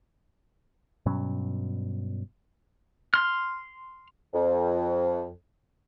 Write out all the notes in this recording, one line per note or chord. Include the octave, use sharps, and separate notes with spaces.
G2 B2 F#3 C#4
C6 F6
F2